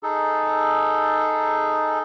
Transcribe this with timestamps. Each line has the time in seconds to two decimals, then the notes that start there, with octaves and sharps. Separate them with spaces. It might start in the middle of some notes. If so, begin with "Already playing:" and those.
0.03 D#4 G#4 A4